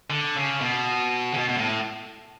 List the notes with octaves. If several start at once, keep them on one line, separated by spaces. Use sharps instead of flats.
D3
C#3
B2
C#3
B2
B2
A2